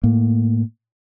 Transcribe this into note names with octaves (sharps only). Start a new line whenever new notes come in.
A2 A#3